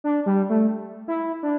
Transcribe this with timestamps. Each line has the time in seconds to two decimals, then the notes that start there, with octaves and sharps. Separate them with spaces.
0.04 D4
0.26 G3
0.49 A3
1.08 E4
1.43 D4